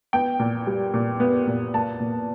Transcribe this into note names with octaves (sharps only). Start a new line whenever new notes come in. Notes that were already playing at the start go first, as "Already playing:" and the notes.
B3 G5
A#2
G3
A#2
B3
A#2
A#3 A5
A#2